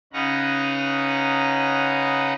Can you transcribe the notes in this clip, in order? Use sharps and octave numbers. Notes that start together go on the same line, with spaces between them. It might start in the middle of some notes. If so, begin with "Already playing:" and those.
C#3 C#4 D#4 B4 F#5 A#5